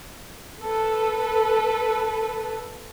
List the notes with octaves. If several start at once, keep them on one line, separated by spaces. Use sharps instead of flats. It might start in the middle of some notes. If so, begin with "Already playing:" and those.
A4 B4